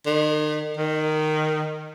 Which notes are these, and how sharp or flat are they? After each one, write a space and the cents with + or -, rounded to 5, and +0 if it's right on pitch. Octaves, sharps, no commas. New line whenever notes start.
D#3 -40
D#3 -10